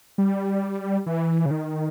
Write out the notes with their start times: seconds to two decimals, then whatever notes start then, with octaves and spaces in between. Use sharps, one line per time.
0.18 G3
1.06 E3
1.46 C#3
1.51 D#3